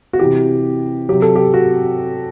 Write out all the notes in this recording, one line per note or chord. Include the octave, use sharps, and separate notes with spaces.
F#4
C3 E3 G4
C3 F#3 G4
A4
G4
F#4